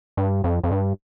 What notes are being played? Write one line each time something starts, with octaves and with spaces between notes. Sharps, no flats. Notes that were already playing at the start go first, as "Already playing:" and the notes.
G2
F2
F2
G2